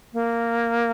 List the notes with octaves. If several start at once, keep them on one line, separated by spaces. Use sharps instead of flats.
A#3